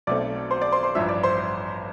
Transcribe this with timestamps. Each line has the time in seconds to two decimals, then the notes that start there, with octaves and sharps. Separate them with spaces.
0.07 B1 B2 A3 C4 D5 D6
0.51 C5 C6
0.61 D5 D6
0.72 C5 C6
0.83 C5 C6
0.95 A1 G2 F3 E5 E6
1.09 D5 D6
1.23 C5 C6